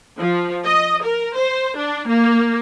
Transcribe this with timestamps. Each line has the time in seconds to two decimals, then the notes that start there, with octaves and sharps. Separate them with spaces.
0.18 F3
0.64 D#5
1.03 A#4
1.36 C5
1.76 D4
2.08 A#3